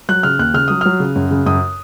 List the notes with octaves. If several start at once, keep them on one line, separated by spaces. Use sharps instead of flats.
F#3 F#6
C#3 F6
D#2 F#6
C#3 F6
F#3 D#6
F#3 F6
C#3
F#2
C#3
F#2 D#6